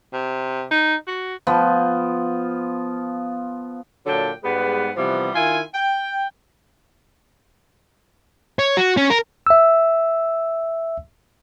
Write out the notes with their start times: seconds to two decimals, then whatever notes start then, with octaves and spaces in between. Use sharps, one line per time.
0.13 C3
0.71 D#4
1.08 F#4
1.47 F3 B3
4.06 A#2 D3 F#3 G5 A5
4.44 G#2 G3 G#3 B3 B4
4.96 C3 E3 F3 G3 B3
5.34 D#3 E4 F4 G#5
5.74 G5
8.59 C#5
8.77 F#4
8.97 C#4
9.10 A#4
9.47 E5 E6